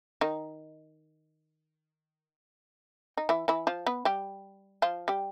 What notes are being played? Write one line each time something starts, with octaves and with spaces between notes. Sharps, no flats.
D#3 D#4
D#4
E3 E4
E3 E4
F3 F4
B3 B4
G3 G4
F3 F4
G3 G4